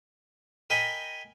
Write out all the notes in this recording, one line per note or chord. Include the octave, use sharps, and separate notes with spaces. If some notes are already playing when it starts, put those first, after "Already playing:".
A#4 D#5 G5 G#5 B5